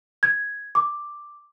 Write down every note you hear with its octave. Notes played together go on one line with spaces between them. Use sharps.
G#6
D6